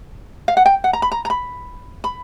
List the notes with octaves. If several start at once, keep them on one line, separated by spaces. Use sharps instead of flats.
F5
F#5
G5
F#5
A#5
B5
A#5
A#5
B5
B5